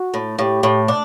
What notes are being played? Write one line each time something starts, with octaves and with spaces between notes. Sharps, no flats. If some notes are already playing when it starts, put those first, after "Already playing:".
Already playing: F#4
A2
A2 G4
A2
D4